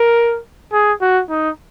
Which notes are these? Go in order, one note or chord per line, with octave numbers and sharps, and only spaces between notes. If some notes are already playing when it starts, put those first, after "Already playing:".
Already playing: A#4
G#4
F#4
D#4